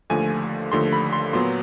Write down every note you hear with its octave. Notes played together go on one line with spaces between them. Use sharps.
D#2 D3 F3 A3 G#5
D#2 D3 F3 A3 C6
B5
C6
A#2 F#3 B3 C6